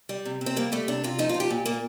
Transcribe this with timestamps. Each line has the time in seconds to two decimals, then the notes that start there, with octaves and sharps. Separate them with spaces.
0.09 G3
0.25 C3
0.41 C3
0.46 C4
0.56 G3 A#3
0.72 G3 A3
0.88 C3 D4
1.04 C3 F4
1.19 F3 D#4
1.29 F4
1.34 F3
1.40 G4
1.50 A#2
1.66 A#2 A#3